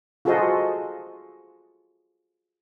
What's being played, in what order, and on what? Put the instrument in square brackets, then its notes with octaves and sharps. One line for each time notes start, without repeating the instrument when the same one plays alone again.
[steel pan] F4 F#4 G#4 A4 C5 D#5